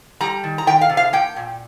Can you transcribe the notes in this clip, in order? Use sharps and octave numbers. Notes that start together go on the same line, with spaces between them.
G3 A#5
D#3
A#5
D#3 G5
F5
C3
F5
A#3 G5
A#2